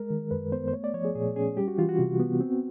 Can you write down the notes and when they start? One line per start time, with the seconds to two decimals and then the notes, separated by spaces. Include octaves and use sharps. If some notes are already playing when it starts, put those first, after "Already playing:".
Already playing: G#3 A#4
0.10 D#3
0.31 F#2 B4
0.52 B3 C5
0.68 C5
0.73 A3 C#5
0.84 D5
0.94 F3 C#5
1.05 G#4
1.15 A#2 G#4
1.36 C#4 G#4
1.57 G3 G4
1.68 F#4
1.78 E3 F4
1.89 F#4
1.99 C3
2.19 B3
2.41 C4